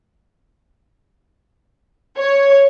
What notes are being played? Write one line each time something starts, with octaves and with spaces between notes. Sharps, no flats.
C#5